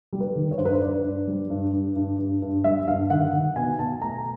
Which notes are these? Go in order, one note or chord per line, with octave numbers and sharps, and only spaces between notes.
G3
B4
D#3
C#5
G2 C5
B4
C5
G2 D5
G2
G3
G2
G2
G2
G2
G2
G3 E5
G2 F5
D#3 F#5
D#3
B2 G#5
B2 A5
A3 A#5